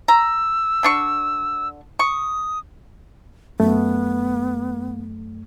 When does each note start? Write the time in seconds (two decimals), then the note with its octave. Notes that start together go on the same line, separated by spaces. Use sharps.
0.08 A#5 E6
0.83 D3 D4 C#6
1.99 C#6 D#6
3.60 F#2 A3 B3